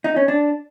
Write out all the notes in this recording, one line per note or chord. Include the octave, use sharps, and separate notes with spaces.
D#4
C#4
D4